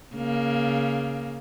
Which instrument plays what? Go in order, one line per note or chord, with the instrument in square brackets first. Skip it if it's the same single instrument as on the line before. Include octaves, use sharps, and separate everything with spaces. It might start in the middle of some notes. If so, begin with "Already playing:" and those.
[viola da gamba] C#3 A#3